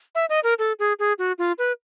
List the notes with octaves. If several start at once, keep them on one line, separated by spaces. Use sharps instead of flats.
E5
D#5
A#4
A4
G#4
G#4
F#4
F4
B4